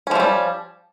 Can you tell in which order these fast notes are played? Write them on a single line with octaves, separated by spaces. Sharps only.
C#4 F3 A3 G3